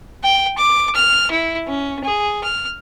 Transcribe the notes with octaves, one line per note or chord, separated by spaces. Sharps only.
G5
D6
F6
E4
C#4
G#4
F6